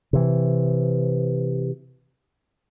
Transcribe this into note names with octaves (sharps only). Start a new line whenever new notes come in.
C3 E3